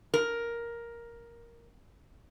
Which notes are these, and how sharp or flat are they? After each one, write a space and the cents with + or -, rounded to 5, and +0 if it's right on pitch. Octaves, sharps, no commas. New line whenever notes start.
A#4 +5